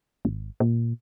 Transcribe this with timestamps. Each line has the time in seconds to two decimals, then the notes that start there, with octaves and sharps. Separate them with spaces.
0.25 G#1
0.60 A#2